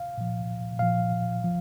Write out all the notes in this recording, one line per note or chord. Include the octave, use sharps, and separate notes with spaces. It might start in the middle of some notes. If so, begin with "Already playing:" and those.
Already playing: F5
A#2 F3
A#2 F3 F5
F3